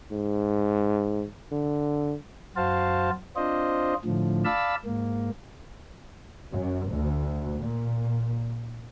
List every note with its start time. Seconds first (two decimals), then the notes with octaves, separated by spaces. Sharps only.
0.12 G#2
1.52 D3
2.56 F#2 F#4 C5 F5 A5
3.36 C4 D4 F4 C5 D#5
4.05 A2 D3 F3
4.45 D5 F5 A5 B5 E6
4.85 G#2 A#3
6.53 F#2
6.91 D2
7.58 A#2